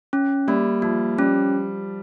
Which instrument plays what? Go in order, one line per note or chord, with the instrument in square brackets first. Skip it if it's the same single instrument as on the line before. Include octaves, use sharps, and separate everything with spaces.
[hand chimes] C#4
[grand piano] G3 [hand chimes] A#3
[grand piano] F3 [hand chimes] A#3
[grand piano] G3 [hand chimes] C#4